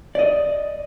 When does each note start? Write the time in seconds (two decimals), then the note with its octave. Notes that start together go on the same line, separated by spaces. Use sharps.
0.15 D5 D#5